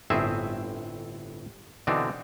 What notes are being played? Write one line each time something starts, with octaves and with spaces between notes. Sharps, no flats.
G1 A2 C4 G#4 E5
B2 D3 E3 C4 D4 D#4